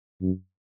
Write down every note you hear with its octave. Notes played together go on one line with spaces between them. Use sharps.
F#2